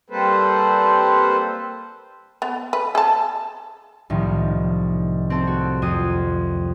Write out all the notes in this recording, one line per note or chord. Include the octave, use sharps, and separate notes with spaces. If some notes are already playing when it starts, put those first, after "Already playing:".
G3 A#3 C4 A4 B4 C5
B3
B4
G#4 A5
C2 A2 D#3 F3
C4 A4
F#4
F2 F4 C5 D#6